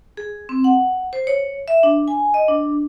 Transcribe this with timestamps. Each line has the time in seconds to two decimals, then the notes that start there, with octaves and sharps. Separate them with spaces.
0.17 G#4
0.49 C4
0.64 F#5
1.13 C5
1.27 C#5
1.68 E5
1.83 D4
2.08 G#5
2.34 D#5
2.48 D4